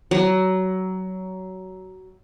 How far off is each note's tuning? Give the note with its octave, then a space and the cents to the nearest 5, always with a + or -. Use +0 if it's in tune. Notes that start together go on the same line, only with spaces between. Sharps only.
F#3 +20